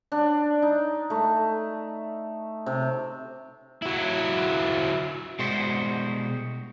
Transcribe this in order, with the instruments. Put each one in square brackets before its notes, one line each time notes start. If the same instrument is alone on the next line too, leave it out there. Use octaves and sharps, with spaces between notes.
[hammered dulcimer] D4
D#4
A3
C3
[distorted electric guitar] F#3 E4
[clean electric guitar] B2 G3 G#3 F#4 C5